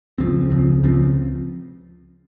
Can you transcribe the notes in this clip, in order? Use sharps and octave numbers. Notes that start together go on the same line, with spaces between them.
C#2 C#3 F3 C4
C#2 C#3 F3 C4
C#2 C#3 F3 C4